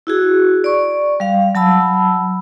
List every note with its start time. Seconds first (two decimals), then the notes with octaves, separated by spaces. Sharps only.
0.07 E4 F#4 G#4
0.64 D5 C#6
1.20 G3 F5
1.55 F#3 A5 B5 E6